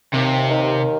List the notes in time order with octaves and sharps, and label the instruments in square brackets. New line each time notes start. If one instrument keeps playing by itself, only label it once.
[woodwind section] D#2 [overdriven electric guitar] C3
[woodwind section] D#3